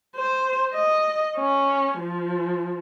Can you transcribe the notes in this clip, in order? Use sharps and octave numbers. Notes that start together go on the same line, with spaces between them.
C5
D#5
C#4
F3